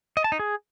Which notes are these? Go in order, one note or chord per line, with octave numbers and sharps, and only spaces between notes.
D#5
A5
D#4
G#4